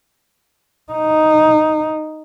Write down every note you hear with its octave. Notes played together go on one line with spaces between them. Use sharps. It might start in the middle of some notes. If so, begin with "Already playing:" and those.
D#4